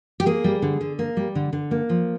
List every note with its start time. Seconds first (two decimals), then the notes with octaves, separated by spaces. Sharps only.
0.20 G4
0.26 A#3 G#4
0.44 G3
0.62 D3
0.81 D3
0.99 A#3
1.17 G3
1.35 D3
1.53 D3
1.71 A#3
1.90 F3